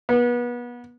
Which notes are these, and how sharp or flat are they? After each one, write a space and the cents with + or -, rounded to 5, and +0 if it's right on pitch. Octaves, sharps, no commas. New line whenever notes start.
B3 -30